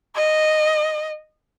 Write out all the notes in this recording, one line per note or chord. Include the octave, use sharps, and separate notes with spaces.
D#5